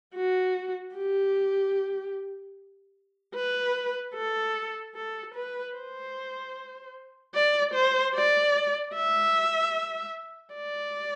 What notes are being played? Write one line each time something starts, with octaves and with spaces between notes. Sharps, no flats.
F#4
G4
B4
A4
A4
B4
C5
D5
C5
D5
E5
D5